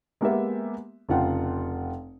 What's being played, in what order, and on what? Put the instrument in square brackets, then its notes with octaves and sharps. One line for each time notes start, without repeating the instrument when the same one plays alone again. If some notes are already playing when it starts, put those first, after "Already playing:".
[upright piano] G#3 A#3 B3 G4 A#4 E5
F1 C#3 F4 F#5 G5 C6